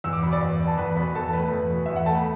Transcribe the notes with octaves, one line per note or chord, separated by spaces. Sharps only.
E2 E6
D6
B2 B5
D5 D6
E2
B3
A5
E2 B4 B5
B2 B4 B5
E2 A4 A5
A5
A3 B4 B5
E2
B2
E2 E5
F#5
A3 A5
B5